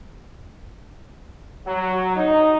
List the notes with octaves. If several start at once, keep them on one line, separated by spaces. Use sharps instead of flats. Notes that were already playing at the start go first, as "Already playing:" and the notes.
F#3
D#4